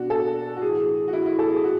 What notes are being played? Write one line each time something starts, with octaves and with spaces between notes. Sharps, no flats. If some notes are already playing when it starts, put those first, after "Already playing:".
Already playing: B2 D4 F#4
A4
F#4
A2 E3 G#4
F#4
E4
E4
A4
G#4
A2 F#4